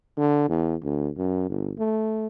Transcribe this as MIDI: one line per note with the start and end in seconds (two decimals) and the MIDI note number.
0.17 0.47 50
0.49 0.75 40
0.83 1.09 38
1.17 1.48 42
1.49 1.73 31
1.79 2.27 57